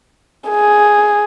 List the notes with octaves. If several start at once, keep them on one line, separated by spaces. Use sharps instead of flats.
G#4